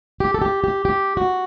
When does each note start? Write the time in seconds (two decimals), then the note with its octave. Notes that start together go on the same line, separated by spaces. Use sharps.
0.20 G4
0.34 A4
0.42 G4
0.64 G4
0.85 G4
1.17 F#4